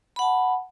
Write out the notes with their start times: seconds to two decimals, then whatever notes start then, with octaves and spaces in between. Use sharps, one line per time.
0.16 B5
0.19 F#5
0.22 A5